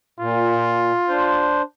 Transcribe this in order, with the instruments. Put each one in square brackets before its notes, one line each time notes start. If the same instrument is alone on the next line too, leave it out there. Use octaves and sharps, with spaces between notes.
[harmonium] A#2 [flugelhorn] F4
[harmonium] D4 C5